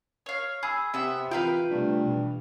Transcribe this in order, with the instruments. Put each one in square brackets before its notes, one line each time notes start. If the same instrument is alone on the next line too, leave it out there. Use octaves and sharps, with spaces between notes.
[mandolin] C#5 F5
[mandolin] G#4 [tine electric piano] B5 E6
[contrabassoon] C3 [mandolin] B3 E5
[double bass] E3 [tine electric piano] F4 A#5 [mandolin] B4 F5 G5
[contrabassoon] G2 [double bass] C3 A3
[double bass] B2 E3